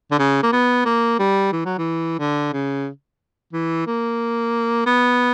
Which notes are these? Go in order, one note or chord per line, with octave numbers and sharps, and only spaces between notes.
D3
C#3
A#3
B3
A#3
G3
E3
F#3
E3
D3
C#3
E3
A#3
B3